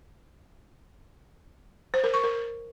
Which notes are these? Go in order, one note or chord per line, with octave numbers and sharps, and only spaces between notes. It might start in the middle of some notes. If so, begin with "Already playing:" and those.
C5
A#4
C#6
A#4